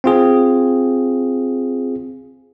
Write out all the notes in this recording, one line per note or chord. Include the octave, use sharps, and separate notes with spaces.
C4 F4 G#4